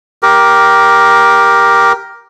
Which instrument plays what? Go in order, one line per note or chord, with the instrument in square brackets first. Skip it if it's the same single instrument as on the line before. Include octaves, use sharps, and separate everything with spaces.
[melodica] G4 A#4